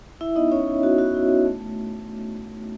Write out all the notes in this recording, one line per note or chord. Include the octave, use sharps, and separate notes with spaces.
E4 E5
B3 D#4 D#5
C#4 E4 C#5
E4
B3 F#4
B3 F#4
E4
B3
A3
A3